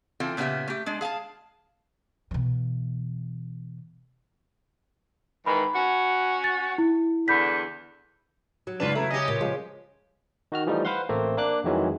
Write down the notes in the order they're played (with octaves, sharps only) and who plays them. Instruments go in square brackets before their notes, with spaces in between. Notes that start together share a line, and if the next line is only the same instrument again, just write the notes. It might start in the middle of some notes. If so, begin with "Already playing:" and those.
[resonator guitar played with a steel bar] E3 C4 F4 A4
A#2 C#3 B3 C#4 G4 E5
A3 G4
G#3 D4
G#4 F5 G#5 A5
[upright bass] B2 E3
[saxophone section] G#2 D#3 E3 [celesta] B5
[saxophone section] C#4 F#4
[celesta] A6
E4
[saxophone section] E2 D3 [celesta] B5 G6 B6
[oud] F#3
[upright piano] G#2 C#3 E7 [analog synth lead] D4 [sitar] F4 B4
[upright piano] C#3 B4 A#5 [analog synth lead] A3 [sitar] E4
[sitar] C#4 G4 [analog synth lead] D#5
[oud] A#2
[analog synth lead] F3 [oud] G#3
[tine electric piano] D#3 F#4 F6
E3 F3 G3 A3 D#4
B4 C5 F5 F#5 C6
A1 A3 A#3 C4
A#3 D4 D6 F#6
F2 D#3 E3 F#3 G#3 C#4